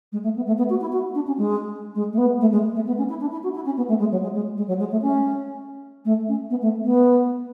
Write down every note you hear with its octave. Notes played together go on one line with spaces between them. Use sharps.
G#3
A3
B3
A3
B3
F#4
E4
F#4
D4
C#4
G#3
G#3
A3
B3
A3
G#3
A3
B3
C#4
E4
D4
E4
F#4
E4
C#4
B3
A3
G#3
F#3
G#3
G#3
G#3
F#3
G#3
A3
C#4
A3
C#4
B3
A3
B3